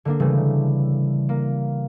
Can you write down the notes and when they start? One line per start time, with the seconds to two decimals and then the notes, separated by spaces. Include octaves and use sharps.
0.05 D3 A#3 D4
0.20 C#3 E3 G3 A3
1.29 A#3